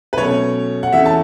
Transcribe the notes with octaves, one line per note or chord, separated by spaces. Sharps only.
B4
B2 F#3 A3 C#4 C#5
F#5
E2 E3 A3 C#4 E5
A5